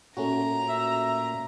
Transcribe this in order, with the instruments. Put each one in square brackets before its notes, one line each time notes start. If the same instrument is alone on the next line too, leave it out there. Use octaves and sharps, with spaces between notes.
[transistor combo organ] A#2 [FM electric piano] A3 C#4 F#4 [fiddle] A#5
[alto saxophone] E5